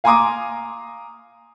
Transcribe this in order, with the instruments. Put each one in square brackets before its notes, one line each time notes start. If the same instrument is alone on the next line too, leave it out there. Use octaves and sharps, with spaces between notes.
[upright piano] F5 G#5 A#5 C6 D6 D#6